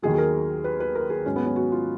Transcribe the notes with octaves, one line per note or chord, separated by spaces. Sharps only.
D#2 D#3 F#3 G#4
G#4
A#4
B4
B4
A#4
G#4
G#2 F#3 C#4
B3
C#4
F#4
F4